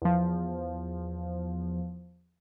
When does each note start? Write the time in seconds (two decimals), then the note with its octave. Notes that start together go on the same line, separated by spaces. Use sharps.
0.02 E2 F3